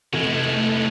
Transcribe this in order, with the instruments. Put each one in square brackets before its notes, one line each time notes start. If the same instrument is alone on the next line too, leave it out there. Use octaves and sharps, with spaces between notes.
[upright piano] F1 [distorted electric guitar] A2 G#3 [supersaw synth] A3